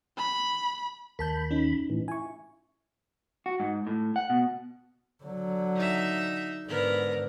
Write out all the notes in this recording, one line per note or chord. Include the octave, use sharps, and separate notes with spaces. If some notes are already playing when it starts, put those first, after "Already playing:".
B5
D#2 A#4 A5 B5 G6
C#4 D#4
A2 E3
E4 G#5 C#6
F#4
G#2
A2
F#5
B2
D3 F#3
D#4 E5
G#2 D3 B3 A#4